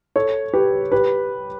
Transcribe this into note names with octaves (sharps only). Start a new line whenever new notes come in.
A4 C#5
G4 B4
G4 B4